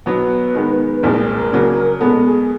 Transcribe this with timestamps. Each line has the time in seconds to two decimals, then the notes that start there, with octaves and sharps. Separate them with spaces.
0.06 B2 F#3 B3 B4
0.54 D#3 G#3 B3
0.95 B4
1.03 C2 A#2 F3 G#3 C4 A#4
1.52 C#3 F#3 A#3 D4
2.00 B2 G#3 B3 A4
2.25 G#4